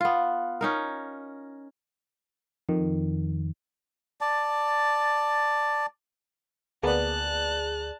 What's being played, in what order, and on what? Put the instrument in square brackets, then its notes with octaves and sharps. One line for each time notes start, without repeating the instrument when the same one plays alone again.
[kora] B3 F4
C#4 D#4 A#4
[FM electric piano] F2 D#3
[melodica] D5 A5
[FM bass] D2 [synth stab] A#3 B3 [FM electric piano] G#4 D5 [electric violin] A5 F#6